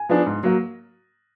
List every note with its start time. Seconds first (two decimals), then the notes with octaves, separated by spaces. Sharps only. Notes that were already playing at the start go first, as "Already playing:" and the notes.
Already playing: G#5
0.09 F3 B3 D4 G#4
0.26 G#2
0.43 F#3 A#3